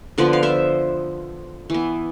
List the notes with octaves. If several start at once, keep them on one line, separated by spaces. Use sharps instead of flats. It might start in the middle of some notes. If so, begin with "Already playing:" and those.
D3 F3 B3 B4 D5
F5
C5 E5
E3 B3